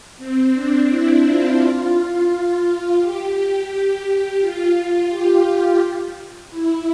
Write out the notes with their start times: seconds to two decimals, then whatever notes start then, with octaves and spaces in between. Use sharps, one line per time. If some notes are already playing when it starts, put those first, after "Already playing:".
0.18 C4
0.53 D4
0.88 E4
1.24 F4
2.99 G4
4.40 F4
4.75 F4
5.10 G4
6.50 E4